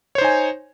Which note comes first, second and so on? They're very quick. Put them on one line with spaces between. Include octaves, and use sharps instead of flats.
C#5 C5 D#4 G#5